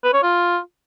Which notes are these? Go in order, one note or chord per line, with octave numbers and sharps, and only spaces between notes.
B4
C#5
F4